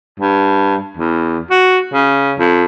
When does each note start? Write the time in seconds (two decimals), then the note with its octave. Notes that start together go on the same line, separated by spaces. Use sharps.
0.20 G2
0.97 E2
1.50 F#4
1.94 C#3
2.39 F2